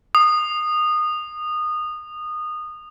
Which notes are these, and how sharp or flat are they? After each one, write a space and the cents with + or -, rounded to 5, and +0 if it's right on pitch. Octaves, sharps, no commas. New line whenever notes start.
D#6 -20